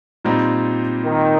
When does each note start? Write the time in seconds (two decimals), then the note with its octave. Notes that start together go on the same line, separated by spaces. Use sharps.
0.24 A#2 G3 C4 D#4
1.05 D#3